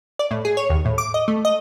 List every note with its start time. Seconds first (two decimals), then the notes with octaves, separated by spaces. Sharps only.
0.19 D5
0.31 A2
0.45 G#4
0.57 C#5
0.70 D#2
0.85 A2
0.98 D6
1.14 D#5
1.28 A3
1.45 D#5